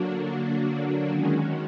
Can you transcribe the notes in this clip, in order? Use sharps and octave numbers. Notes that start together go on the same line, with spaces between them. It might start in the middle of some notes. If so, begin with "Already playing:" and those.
Already playing: D3 F#3 A#3 D4 F#4
D#3 G#3 C#4 F#4